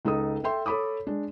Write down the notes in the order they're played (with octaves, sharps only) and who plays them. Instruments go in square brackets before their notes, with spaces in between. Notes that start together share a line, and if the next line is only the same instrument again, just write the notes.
[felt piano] C#2 D#4 A4 D#6
A4 E5 G5 C6
A4 C#5 B5 D6 D#6
G#3 D4